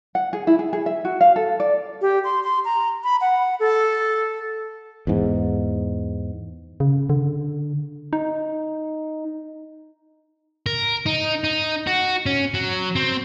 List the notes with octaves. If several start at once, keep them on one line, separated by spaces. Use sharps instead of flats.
F#5
G#4
E4
G#4
G#4
E5
F#4
F5
A4
D5
G4
C6
C6
A#5
B5
F#5
A4
E2 G#2
C#3
D3
D#4
A#4
D#4
D#4
F#4
C#4
F#3
C4